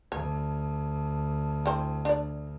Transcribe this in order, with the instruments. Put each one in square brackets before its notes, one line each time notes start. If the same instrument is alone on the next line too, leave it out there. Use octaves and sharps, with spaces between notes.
[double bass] D2 [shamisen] C#5
[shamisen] E3 C4
D4 D5